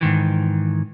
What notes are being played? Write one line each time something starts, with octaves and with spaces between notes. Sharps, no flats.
G#2 D#3 E3